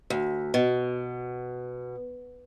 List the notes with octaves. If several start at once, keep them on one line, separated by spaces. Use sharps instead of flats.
D2
B2